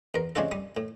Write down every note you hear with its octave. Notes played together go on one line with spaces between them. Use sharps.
E2 A#4
C3 G#3 C#4 D4 F4 A4
G3 D#6
A2